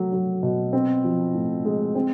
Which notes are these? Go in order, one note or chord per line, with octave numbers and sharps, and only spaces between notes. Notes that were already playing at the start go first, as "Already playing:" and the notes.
Already playing: F#3 A3
F#3
B2
C4
F3
A2
G#3
C4